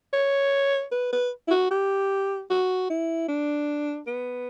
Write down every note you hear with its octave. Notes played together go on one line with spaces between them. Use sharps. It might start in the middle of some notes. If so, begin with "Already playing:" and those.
C#5
B4
B4
E4
F#4
G4
F#4
E4
D4
B3